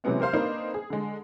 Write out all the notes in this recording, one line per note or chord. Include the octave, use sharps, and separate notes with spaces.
C3 E3 F#3 G#3 B3 C#4
G4 A#4 C5 F5 C6
A#3 C4 D4 D#4 B4 C5
G#4
D3 G#3